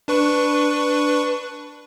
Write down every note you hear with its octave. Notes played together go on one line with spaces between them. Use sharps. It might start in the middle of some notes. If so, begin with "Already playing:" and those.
D4 B4 C#6